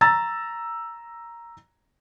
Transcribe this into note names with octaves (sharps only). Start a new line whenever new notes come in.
A#5 E6 A6